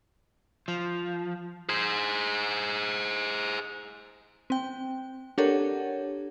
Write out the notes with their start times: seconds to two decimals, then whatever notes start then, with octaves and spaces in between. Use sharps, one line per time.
0.68 F3
1.69 G#4 C5
4.50 C4 G5
5.38 D4 G4 A4 A#4 C#5 F#5